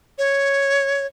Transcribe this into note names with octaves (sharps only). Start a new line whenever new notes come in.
C#5